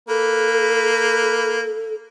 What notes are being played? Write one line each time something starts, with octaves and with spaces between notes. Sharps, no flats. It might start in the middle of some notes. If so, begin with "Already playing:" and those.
A#3 A4 B4